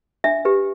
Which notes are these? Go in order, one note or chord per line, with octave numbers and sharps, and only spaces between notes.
D4 E5
G4 B4